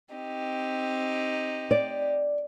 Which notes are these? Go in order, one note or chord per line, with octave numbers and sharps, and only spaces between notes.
C4 D#4 G4
D5